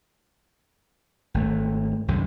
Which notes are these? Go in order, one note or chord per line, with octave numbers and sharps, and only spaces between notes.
G#1 A3
C2 F#2 C3 D#3